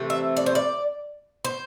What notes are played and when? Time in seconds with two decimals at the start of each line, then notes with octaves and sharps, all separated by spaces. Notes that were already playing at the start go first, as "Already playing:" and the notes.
Already playing: C3 E3 A3 C4
0.10 E5
0.37 D5
0.46 C5
0.55 D5
1.45 C5